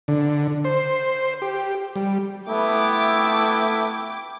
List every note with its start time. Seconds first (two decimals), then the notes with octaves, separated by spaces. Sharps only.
0.08 D3
0.65 C5
1.42 G4
1.96 G3
2.48 A3 B3 E4 G5 D6